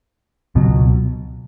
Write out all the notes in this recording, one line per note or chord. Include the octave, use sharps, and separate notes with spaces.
C#2 B2 F#3